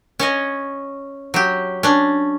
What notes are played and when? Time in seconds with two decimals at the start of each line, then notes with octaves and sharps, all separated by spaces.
0.19 C#4 C#5 D#5
1.34 F#3 G4
1.83 C#4 D4